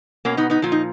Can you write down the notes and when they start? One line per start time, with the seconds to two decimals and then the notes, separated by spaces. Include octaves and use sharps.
0.25 B2 A#3 C#4
0.37 B3 D#4
0.50 B3 D#4
0.62 A#2 F3 F4
0.72 D#4